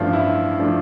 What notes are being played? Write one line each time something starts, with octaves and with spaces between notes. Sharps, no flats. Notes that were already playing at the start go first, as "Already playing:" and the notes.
Already playing: A1 G2 F3 A3 D4 F4
E4
F3 A3 D4